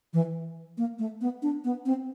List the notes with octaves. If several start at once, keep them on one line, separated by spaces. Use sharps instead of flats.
E3
A#3
A3
B3
D4
B3
C4